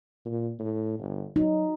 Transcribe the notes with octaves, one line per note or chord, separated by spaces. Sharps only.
A#2
A2
G1
F#3 D#4